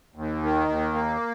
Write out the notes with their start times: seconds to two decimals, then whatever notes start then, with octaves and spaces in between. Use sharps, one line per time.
0.16 D#2
0.43 D#3
0.68 D#2
0.94 A#3